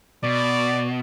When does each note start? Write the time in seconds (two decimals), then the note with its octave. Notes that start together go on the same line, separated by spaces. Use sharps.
0.24 B2 D5